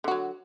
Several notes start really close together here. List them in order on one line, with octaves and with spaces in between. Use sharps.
D3 F#4 F#3